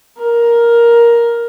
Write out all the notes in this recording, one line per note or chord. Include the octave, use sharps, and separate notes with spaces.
A#4